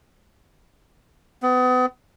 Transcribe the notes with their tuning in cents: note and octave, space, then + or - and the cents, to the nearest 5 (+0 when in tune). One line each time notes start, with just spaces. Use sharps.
B3 +35